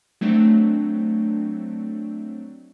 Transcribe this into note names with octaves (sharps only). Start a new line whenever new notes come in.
F#3 A3 C4 D4